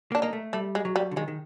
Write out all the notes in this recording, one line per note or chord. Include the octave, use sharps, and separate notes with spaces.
A#3
D4
A#3 D#4
A3
G3 A3
G#3
F#3
G3
D3
D#3 G#3
D#3